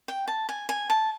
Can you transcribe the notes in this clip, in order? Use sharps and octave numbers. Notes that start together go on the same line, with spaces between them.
G5
A5
G#5
G#5
A5